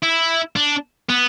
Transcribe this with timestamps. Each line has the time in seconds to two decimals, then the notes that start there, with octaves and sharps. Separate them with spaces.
0.03 E4
0.56 D4
1.10 B3